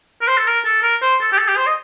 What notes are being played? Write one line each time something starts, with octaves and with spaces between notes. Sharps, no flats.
A#4
C5
A4
A#4
A4
A#4
C5
A4
G4
A4
G4
C5
D#5